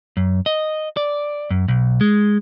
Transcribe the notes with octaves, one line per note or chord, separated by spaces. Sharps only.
F#2
D#5
D5
F#2
B1
G#3